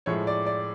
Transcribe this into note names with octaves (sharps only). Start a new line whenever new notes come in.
A2 F3 G#3 C#5
D5
D5